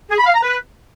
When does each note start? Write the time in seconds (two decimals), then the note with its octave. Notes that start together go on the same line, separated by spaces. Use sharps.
0.10 G#4
0.18 B5
0.26 F5
0.34 A#5
0.42 B4